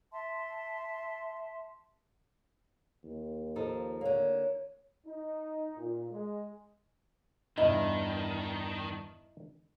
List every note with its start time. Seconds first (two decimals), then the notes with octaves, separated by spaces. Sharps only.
0.12 E5 A5 C6
3.04 D#2
3.56 F3 D#4 A4
4.01 D3 A#3 C#5
5.07 D#4
5.77 A#2
6.11 G#3
7.58 E2 G2 D#3 D#4 E4 D#5